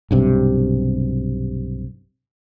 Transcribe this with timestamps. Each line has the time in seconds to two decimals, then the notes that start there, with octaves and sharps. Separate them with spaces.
0.11 B1 G2 C3